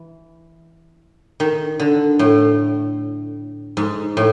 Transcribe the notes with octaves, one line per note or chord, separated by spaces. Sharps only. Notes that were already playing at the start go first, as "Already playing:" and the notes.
Already playing: E3
D#3
D3
A2
G#2
A2